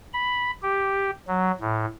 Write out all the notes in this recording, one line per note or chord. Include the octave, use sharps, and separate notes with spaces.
B5
G4
F#3
A2